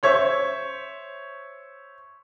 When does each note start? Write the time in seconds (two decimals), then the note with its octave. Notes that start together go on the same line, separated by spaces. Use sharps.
0.03 C5 C#5 E5 C#6